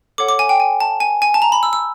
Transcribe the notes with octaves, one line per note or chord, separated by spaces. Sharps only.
A4 C#5 F#5 D6
D6
G#5
G5
G#5
A5
G#5
G#5
A5
A#5
B5
E6
E6